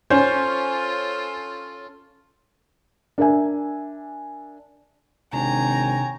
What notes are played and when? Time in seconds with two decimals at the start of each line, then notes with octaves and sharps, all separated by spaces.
0.10 C#4 F4 A4 C5
3.18 D4 A#4 D5 E5 G#5
5.33 G#1 C3 D4 G4 C#5 G5 G#5 A#5